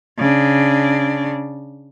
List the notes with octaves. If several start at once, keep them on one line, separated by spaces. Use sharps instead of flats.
C#3 D4